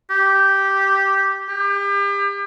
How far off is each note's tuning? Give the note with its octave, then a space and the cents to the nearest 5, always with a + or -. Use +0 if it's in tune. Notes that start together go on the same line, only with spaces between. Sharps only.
G4 -5
G4 +35